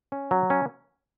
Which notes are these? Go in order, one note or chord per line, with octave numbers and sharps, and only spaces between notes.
C#4
F#3
C#4